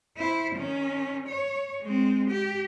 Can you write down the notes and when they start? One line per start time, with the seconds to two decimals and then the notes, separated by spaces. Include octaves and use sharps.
0.17 E4 C5
0.55 D#3 C#4
1.28 C#5
1.82 G#3 C4
2.30 G4